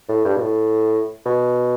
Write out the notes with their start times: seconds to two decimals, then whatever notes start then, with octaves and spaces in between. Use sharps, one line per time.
0.09 A2
0.25 G2
0.36 B2
0.42 A2
1.26 B2